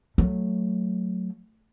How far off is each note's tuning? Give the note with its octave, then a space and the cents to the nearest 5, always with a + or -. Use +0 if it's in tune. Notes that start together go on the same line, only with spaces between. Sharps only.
F#3 +0 A3 +0